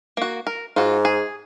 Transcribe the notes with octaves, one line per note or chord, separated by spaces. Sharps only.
A#3 F#4
A#4
G#2 F4 F#4
G#4